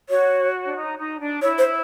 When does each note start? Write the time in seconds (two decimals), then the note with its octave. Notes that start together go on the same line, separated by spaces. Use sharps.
0.09 F#4 C#5
0.66 D4
0.75 D#4
0.97 D#4
1.20 D4
1.42 E4 C#5
1.58 C5